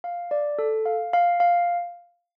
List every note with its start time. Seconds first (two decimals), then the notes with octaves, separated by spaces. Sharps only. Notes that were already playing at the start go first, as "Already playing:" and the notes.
0.04 F5
0.31 D5
0.59 A4
0.86 F5
1.13 F5
1.40 F5